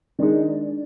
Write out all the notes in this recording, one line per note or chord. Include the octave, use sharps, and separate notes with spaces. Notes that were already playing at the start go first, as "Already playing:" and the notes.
D#3 G#3 D4 D#4